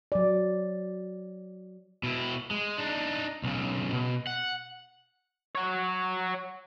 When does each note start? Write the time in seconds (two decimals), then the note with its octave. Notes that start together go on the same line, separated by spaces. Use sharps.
0.12 F#3 D5
2.03 B2 E4
2.51 G#3
2.78 D4 D#4
3.44 B1 C#3
3.92 B2
4.27 F#5
5.55 F#4 C#5